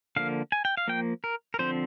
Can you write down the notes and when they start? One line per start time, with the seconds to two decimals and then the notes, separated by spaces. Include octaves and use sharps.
0.16 D3 F3 A#3 F5
0.52 G#5
0.65 G5
0.77 F5
0.88 F3 A#3 G5
1.24 A#4
1.54 A#4
1.59 D3 F3 C4 C5